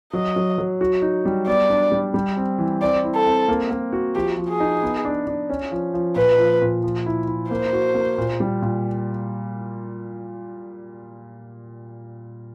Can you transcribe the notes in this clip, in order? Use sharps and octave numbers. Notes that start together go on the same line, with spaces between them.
F#3 D#5
F#3
F#3
F#4
D#4
G3
B3 D5
D4
G3
G3
C4
E3
C4 D5
E4
A4
C4
A#3
A#3
F#4
F3 G4
F3
G#4
D#4
B3
D4
D4
C#4
F3
F3
A#2 B4
F3
A#2
F3
E4
E4
A#3 C5
F#4
A#3
A#2
G3
A#2